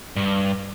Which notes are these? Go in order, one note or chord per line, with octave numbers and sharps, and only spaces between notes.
G2